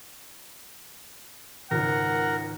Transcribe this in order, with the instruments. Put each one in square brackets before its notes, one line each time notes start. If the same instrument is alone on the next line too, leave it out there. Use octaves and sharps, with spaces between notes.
[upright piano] G#1 C#2 [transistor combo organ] A#4 [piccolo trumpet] F#5